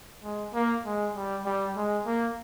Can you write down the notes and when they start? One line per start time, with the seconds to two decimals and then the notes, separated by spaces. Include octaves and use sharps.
0.23 G#3
0.54 A#3
0.85 G#3
1.15 G3
1.45 G3
1.76 G#3
2.06 A#3